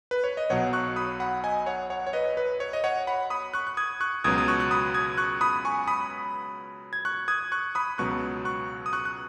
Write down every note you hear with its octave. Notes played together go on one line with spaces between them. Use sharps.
B4
C#5
D#5
B1 B2 F#3 C#5 F#5
C#6 F#6
B5 D#6
F#5 B5
D#5 G#5
C#5 F#5
C#5 F#5
C#5
B4 D#5
B4
C#5
D#5
C#5 F#5
F#5 B5
B5 D#6
C#6 F#6
F#6
D#6 G#6
C#6 F#6
C#2 B2 F#3 D#6 G#6
D#6
C#6 F#6
F#6
B5 D#6
D#6 G#6
C#6 F#6
B5 D#6
G#5 C#6
B5 D#6
G#6
C#6 F#6
D#6 G#6
C#6 F#6
B5 D#6
C#2 B2 F#3 C#6 F#6
C#6 F#6
D#6
C#6 F#6
F#6